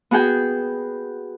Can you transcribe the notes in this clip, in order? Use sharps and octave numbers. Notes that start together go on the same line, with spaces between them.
B3 F#4 G#4 G5